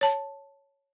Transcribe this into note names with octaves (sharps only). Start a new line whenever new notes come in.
C#5 A5